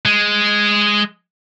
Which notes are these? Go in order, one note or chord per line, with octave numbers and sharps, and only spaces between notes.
G#3